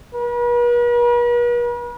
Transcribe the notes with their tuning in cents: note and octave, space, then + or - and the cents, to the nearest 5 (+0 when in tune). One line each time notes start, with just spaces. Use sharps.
B4 -45